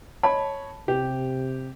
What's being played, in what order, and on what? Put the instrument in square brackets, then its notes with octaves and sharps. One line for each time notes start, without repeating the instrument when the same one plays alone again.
[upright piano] C#5 D#5 B5 [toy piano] A5
[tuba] C3 [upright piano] G4